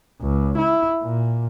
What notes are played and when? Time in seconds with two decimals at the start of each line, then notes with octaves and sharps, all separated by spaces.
0.21 C#2
0.58 E4
1.03 A#2